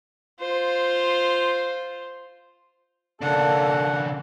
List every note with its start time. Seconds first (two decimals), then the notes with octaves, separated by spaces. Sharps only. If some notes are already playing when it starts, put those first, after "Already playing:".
0.40 F4 C5
3.22 C#3 A#3 D4 A4 F#5